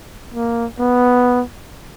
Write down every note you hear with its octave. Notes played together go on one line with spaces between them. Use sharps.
A#3
B3